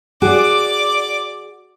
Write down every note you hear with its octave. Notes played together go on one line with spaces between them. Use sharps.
F#4 G#4 D5 D6